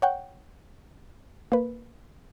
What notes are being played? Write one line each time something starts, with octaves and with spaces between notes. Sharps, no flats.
C#5 F#5 G5
A#3 B4